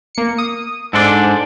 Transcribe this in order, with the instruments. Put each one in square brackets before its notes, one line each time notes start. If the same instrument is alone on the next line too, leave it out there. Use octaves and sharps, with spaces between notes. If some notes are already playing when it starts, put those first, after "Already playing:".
[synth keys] A#3 C#7
D#6
[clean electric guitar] G#2 D4 [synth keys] A4 C5 D5